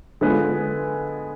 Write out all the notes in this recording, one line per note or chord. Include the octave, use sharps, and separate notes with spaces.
D3 G#3 B3 F4 B4